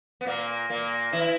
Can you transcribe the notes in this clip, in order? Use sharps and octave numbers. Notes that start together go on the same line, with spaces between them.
B3
A#2 A#3
A#2 A#3
E3 E4